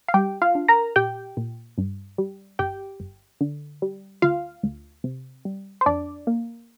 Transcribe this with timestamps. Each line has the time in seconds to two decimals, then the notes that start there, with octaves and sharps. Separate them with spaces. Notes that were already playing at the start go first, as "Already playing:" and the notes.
0.08 F5
0.14 G3 G4 G5
0.42 F4 F5
0.55 D4
0.68 A#4 A#5
0.96 A#2 G4 G5
1.37 A#2
1.78 G2
2.18 G3
2.59 G1 G4 G5
3.00 G1
3.41 D3
3.82 G3
4.22 D2 F4 F5
4.63 D2
5.04 C3
5.45 G3
5.81 C5
5.86 F2 D4 D5
6.27 A#3